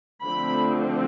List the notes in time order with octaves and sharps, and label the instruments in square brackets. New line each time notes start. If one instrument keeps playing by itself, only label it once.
[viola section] D3 F3 A3 C4 B5